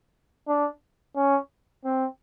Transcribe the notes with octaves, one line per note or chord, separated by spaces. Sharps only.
D4
C#4
C4